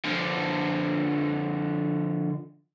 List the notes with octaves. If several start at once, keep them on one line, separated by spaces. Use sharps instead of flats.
D3 F3